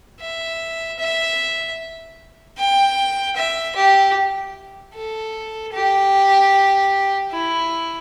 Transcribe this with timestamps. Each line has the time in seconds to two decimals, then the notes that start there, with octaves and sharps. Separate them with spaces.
0.20 E5
0.99 E5
2.58 G5
3.36 E5
3.76 G4
4.95 A4
5.73 G4
7.32 E4